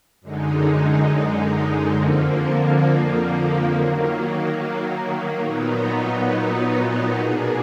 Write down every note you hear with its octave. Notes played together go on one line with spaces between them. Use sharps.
F#2 D3 G#3 D#4
F2 D3 F3 A#3
D#3 F#3 A#3
A#2 F#3 B3 D#4
B2 A#3 D4 G#4